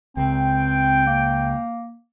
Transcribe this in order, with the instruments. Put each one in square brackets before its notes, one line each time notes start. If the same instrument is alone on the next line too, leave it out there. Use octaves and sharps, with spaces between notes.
[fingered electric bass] C#2 [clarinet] C4 [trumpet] G5
[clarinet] A#3